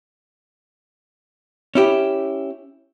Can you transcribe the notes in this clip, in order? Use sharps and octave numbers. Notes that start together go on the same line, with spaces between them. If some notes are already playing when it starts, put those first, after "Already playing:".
C#4 E4 G4